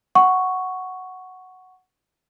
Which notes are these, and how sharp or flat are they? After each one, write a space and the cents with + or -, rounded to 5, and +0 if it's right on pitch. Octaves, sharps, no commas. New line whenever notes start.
F#5 +0 C#6 +0